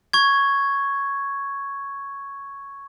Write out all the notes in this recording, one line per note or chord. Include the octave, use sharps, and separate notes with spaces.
C#6 G#6